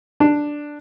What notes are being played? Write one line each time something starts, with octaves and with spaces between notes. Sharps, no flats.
D4